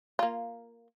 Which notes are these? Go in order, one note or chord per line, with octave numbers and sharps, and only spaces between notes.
A#3 F4